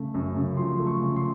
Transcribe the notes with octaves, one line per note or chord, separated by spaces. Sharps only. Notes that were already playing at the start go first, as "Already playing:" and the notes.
Already playing: C#3 A3
F#2
C#3
F3 C6
A3
C#6
C#3
C6